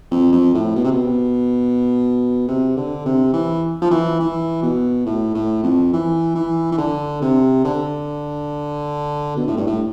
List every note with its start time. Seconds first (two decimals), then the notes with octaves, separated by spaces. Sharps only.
0.11 F2
0.32 F2
0.54 A2
0.75 B2
0.84 C3
0.92 B2
2.48 C3
2.76 D3
3.05 C3
3.33 E3
3.82 F3
3.91 E3
4.20 E3
4.62 B2
5.06 A2
5.34 A2
5.63 F2
5.93 E3
6.35 E3
6.72 E3
6.78 D3
7.22 C3
7.65 D3
9.36 B2
9.47 A2
9.57 G2
9.67 A2